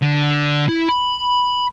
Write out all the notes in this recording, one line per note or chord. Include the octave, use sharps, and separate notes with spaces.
D3
E4
B5